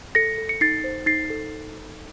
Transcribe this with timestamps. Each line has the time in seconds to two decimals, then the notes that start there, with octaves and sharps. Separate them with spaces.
0.15 A4 A#6 C#7
0.38 A4
0.49 C#7
0.61 D#4 A6 C7
0.84 C5
1.06 D#4 A6 C7
1.30 A4